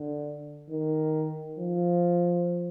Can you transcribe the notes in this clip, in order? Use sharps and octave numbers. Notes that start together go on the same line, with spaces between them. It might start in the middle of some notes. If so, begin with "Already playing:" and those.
Already playing: D3
D#3
F3